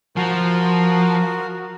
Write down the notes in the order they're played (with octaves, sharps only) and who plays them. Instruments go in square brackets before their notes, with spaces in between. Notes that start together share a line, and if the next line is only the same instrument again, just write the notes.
[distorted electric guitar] F3 [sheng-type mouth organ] F#4 A#4